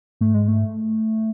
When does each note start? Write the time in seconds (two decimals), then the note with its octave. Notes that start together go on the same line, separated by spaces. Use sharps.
0.21 G#2 A3
0.34 G#3
0.48 A3